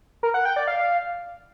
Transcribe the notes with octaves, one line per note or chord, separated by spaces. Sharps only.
A#4
F#5
G5
D5
F5